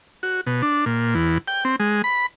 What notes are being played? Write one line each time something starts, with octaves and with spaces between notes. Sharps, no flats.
F#4
B2
D4
A#2
E2
G5
C4
G#3
B5